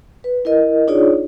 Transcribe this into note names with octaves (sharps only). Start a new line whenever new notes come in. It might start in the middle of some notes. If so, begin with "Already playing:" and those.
B4
E4 A#4 D#5
D4 D#4 F4 G#4 C#5 D5